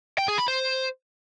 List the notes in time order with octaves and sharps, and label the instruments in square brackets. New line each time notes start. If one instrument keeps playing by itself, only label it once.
[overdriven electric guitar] G5
G#4
B5
C5